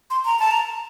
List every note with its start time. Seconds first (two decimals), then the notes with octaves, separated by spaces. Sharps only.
0.10 C6
0.25 A#5
0.39 A5
0.51 A#5